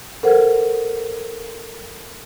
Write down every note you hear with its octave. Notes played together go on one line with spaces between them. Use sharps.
A4 A#4 C5 F#5